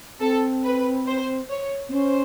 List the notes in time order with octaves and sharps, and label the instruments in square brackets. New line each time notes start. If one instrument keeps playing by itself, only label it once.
[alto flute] C4 [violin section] A4
[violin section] B4
C5
C#5
[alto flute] C4
[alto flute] C#4 [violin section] C5